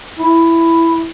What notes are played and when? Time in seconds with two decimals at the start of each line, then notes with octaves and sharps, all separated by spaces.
0.18 E4